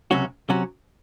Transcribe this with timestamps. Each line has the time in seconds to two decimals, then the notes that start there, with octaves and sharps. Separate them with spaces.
0.11 C#2 C3 F#3 C#4 F#4
0.49 C3 F#3 C#4 F#4